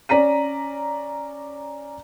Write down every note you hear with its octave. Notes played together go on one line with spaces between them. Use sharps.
C#4 D5 A#5 B6 D#7